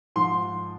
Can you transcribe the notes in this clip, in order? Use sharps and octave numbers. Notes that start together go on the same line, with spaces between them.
G#2 F3 C6